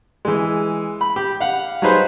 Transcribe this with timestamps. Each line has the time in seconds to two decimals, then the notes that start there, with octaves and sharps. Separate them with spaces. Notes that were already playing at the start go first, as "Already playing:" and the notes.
0.25 E3 G#3
1.01 B5
1.16 G4
1.40 F5 F#5
1.82 F#3 G3 D#4 G#4 B4 C5